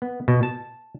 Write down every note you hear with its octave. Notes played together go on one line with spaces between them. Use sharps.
B3
B2
A5